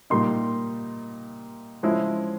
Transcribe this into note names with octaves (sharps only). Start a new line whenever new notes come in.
A#2 G3 A#3 D#4 C6
F3 G#3 C#4 E4